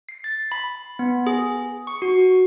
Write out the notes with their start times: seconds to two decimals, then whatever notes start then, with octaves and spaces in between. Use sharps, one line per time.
0.09 C7
0.24 A6
0.52 B5
0.99 B3
1.27 G#4
1.87 C#6
2.02 F#4